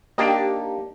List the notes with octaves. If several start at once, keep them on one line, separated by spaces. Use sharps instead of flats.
A#3 D4 D#4 G4